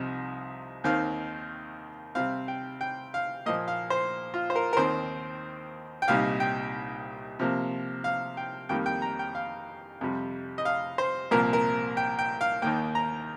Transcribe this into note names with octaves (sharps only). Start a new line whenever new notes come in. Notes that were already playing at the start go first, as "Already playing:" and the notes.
Already playing: C2 C3 F3 D#4
D#2 D#3 C4 F5
C3 G3 C4 F5
G5
G5
F5
A#2 F3 A#3 D#5
F5
C5
F4
C5
A#4
A#4
D#2 D#3 C4 C5
G5
C2 A#2 G3 D#4 F5
G5
C3 F3 A#3
F5
G5
F2 D#3 G3 A#3 G5
G5
A#5
G5
F5
F2 C3 G3
D#5
F5
C5
C2 A#2 F3 A#3 A#4
A#4
G5
G5
F5
D#2 D#3 A#3 G5
A#5